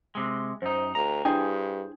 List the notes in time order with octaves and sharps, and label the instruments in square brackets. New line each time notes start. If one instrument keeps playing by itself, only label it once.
[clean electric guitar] C3 G#3
[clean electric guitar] F#2 D#4 [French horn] C5
[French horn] D2 [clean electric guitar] A#5
[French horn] G2 [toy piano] D4 E4 G5 [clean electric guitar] G#4 C5